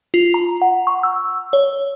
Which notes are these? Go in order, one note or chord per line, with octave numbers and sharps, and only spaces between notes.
F4
A#5
F#5
C#6
E6
C#5